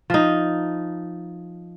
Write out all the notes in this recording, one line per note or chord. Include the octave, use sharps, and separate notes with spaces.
F3 D#4